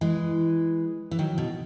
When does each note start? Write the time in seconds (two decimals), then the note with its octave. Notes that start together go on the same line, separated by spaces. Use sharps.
0.01 E3 G#3
1.11 E3
1.19 D#3 F#3
1.38 B2